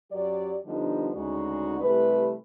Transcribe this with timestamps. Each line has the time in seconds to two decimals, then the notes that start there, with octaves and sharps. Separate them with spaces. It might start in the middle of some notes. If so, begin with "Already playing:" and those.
0.12 F#2 F#3 G4 D5
0.66 D3 F3 G3 B3 D4 D#4
1.14 D2 C#3 G#3 D#4 F#4 D5
1.81 C3 E3 G3 A3 B4